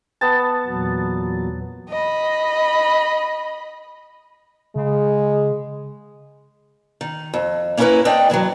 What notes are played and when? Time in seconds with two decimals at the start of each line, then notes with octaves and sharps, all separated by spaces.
0.21 B3 A5
0.66 E2 A#2 F#3
1.90 D#5 B5
4.76 C#3 G#3
7.01 D#3
7.34 F2
7.77 A#3 C#4 E4 F#4 A#4 B4
8.05 C4 D4 D5 D#5 G5
8.30 G2 D3 E3 F#3